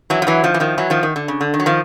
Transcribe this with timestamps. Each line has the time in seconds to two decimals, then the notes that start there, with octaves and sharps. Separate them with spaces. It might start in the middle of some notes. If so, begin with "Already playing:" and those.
0.10 E3 F#3
0.22 F3
0.27 E3 F#3
0.44 D#3 F3
0.54 E3
0.60 D#3 F3
0.78 E3 F#3
0.90 D#3 F3
1.03 D#3
1.16 D3
1.28 C#3
1.41 D3
1.54 D#3
1.60 F#3
1.66 D#3 F3